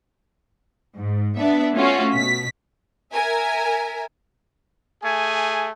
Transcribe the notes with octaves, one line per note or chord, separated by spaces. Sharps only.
G#2
B3 D4 E5
A3 C#4 F4 F#4
B2 B6
A#4 E5 G#5
A3 G#4 G#5